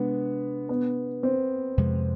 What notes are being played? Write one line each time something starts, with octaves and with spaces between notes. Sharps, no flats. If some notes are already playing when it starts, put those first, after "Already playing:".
Already playing: C3 G#3 B3 D4
B3
C4
F2 C3 G#3